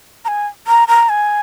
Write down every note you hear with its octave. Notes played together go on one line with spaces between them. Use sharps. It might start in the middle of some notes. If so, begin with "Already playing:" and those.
A#5
G#5
A#5
A#5
G#5